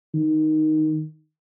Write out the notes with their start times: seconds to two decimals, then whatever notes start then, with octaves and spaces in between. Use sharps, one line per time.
0.14 D#3